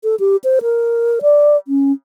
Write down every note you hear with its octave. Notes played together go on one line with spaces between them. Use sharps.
A4
G4
C5
A#4
D5
C#4